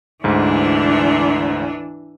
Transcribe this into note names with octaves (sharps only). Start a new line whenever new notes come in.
D2 G#2 E3 D4